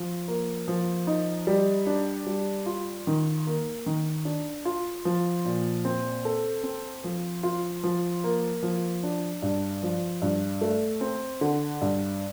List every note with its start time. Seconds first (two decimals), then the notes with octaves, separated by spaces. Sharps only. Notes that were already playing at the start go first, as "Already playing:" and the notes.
Already playing: F3
0.28 A#3
0.68 F3
1.07 D#4
1.47 G3
1.87 D4
2.27 G3
2.66 F4
3.07 D#3
3.47 A#3
3.86 D#3
4.25 D4
4.65 F4
5.05 F3
5.45 A#2
5.85 C4
6.25 A4
6.64 C4
7.04 F3
7.43 F4
7.84 F3
8.24 A#3
8.63 F3
9.03 D4
9.42 G2
9.83 F3
10.22 G2
10.61 A3
11.01 C4
11.41 D3
11.81 G2